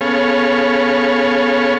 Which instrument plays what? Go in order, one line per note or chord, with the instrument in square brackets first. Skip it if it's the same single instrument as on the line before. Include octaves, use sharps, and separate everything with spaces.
[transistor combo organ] B3 C#4 G#4 A4 C#5 F5